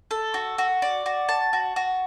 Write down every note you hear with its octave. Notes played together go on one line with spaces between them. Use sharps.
A4
F#4
F#4
D5
F#4
A5
F#4
F#4